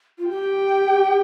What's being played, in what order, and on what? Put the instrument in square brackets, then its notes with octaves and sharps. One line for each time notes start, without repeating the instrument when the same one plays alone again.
[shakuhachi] F4
[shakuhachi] G4 [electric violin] G5